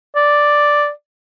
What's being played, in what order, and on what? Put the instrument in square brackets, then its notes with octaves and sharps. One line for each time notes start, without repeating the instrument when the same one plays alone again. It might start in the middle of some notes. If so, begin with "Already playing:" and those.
[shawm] D5